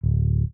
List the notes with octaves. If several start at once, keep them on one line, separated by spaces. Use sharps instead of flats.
D1